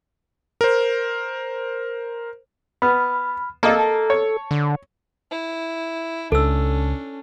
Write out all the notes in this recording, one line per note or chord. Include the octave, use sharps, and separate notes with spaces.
A#4 C5
B3 B5 F6
A#3 A4 D#5 A5
C#5
D3
E4
C#2 C#4 D4 A4 E6